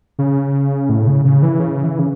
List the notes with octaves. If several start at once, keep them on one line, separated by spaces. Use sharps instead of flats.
C#3
A2
C#3
C#3
E3
C#3
E3
C#3